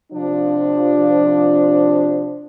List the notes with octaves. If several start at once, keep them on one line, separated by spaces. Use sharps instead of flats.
C3 F3 D4